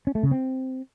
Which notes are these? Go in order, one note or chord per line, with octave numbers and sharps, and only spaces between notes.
C#4
A3
C#3
C4